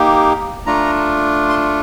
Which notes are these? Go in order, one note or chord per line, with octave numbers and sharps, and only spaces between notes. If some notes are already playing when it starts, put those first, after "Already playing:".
Already playing: A#3 D#4 G4
A3 D4 F4 A#5
C6